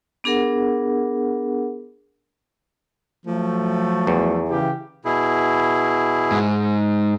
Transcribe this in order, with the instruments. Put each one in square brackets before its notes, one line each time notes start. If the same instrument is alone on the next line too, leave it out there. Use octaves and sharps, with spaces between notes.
[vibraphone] B3 D4 G#4 A#4 F#5
[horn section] F3 F#3 A3
[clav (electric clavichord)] E2
[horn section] C#3 E3 G4
[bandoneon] B2 E4 G#4
[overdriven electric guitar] G#2